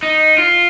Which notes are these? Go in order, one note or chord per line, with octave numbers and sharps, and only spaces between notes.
D#4
F4